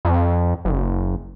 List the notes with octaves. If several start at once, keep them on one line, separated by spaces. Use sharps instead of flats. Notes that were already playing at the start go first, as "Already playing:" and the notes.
F2
F#1